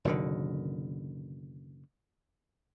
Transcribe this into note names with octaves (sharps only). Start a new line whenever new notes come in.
F#1 B2 D3 D#3